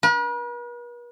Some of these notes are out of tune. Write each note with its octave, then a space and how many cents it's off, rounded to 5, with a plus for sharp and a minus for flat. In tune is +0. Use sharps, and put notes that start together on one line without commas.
B4 -45